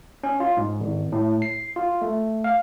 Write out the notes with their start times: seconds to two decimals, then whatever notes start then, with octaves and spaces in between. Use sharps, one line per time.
0.24 C#4
0.40 F4
0.57 G#2
0.80 G#1
1.12 A2
1.42 C7
1.76 F4
2.02 A3
2.44 F5